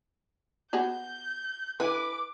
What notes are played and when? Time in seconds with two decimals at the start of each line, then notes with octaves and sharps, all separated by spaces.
0.73 B3 F#4 G#4 G6
1.80 E4 B4 G#5 D6